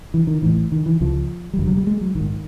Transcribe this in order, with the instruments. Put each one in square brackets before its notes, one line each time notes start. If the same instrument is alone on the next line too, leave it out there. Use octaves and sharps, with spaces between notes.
[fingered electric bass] E3
D#3
A1 A2 E3
D#3
E3
C#2 C#3 F3
G3
F1 D#2 D3 F#3
F#3
G3
G#3
F#3
A#1 G#2 D#3